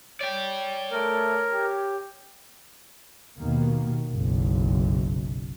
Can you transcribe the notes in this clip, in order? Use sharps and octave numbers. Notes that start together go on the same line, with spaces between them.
C#5 D5 G5
A3 A#4
G4
D#2 B2 D#3 A#3
F#1 B1